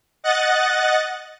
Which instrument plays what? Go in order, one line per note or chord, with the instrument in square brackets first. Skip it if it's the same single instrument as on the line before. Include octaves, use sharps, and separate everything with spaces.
[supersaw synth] D#5 F#5 F#6 A6